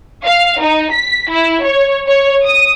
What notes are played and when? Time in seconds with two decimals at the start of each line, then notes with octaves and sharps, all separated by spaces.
0.25 F5
0.62 D#4
0.93 B6
1.31 E4
1.65 C#5
2.08 C#5
2.44 D#6